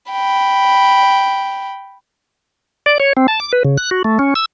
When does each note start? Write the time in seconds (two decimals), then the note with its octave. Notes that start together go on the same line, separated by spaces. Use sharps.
0.12 G5 B5
2.86 D5
3.00 C#5
3.17 C4
3.28 A5
3.40 D6
3.53 B4
3.64 C#3
3.78 F#6
3.91 F#4
4.04 A3
4.19 C#4
4.35 E6